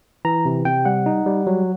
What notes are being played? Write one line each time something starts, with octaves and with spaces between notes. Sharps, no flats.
E3 A#5
C3
C3 G5
G3 F#5
D#4
G3
F#3